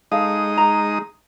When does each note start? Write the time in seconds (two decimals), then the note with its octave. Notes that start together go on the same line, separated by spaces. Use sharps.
0.12 G#3 D#4 A4 F5 D#6
0.57 A#5